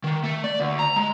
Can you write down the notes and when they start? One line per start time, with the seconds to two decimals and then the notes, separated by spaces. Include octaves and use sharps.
0.04 D#3
0.24 A3
0.44 D5
0.60 D2
0.79 A#5
0.96 G#3